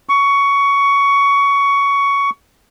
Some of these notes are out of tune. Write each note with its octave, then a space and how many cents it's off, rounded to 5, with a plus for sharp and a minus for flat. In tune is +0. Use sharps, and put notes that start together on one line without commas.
C#6 +15